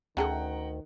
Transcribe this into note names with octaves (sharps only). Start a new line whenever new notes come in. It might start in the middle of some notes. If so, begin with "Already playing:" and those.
D2 D#3 C#4 G#4 A4 F#5 G5 A#5